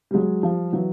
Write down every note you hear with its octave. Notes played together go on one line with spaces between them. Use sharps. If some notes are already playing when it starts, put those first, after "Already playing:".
G3
F#3 G#3
F3 G3
E3 F#3